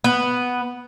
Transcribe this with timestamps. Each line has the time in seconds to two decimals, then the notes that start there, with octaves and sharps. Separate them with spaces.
0.04 B3